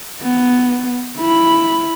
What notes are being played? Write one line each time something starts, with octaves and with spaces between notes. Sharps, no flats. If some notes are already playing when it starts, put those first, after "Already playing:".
B3
E4 B5